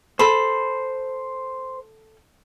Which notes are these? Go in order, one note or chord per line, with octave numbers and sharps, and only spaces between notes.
A4 C5 B5